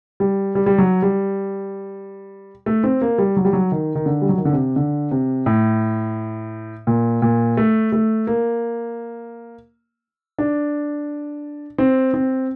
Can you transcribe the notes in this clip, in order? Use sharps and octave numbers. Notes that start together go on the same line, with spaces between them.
G3
G3
G3
F#3
G3
A3
C4
A#3
G3
F#3
G3
F#3
D#3
D#3
D3
G3
F#3
D#3
D3
C3
D3
C3
A2
A#2
A#2
A3
A3
A#3
D4
C4
C4